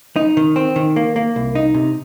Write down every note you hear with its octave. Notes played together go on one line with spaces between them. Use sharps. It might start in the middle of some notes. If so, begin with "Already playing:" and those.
D#4
D#3
C4
D#3
A#3
A#3
C2
D#4
C3